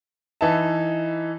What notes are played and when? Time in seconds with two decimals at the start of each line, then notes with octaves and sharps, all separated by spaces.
0.41 E3 D#4 E5 A5